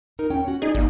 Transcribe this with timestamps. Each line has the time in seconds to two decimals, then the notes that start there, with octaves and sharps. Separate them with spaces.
0.19 D#4 A#4
0.30 E2 C#4 G5
0.45 C#4 F#4
0.62 D#4 G#4 D5 D#5
0.75 G#1 A#3 D#4